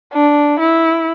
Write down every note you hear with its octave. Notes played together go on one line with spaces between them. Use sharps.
D4
E4